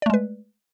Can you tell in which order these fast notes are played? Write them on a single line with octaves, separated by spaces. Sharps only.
D5 A3 G#3 B4